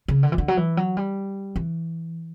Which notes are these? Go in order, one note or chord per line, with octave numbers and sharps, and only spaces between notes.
C#3
D3
E3
D3
F#3
E3
F#3
G3
E3